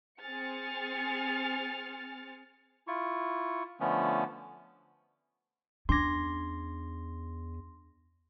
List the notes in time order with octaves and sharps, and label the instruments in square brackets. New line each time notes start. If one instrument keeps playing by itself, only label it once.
[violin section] C4 G#4 G#5 F6 A6 C#7
[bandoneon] E4 F4 C#6
D3 F3 A3 B3 C#4
[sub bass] E2 [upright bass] C#4 [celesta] D4 D6 G#6 [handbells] C6 A#6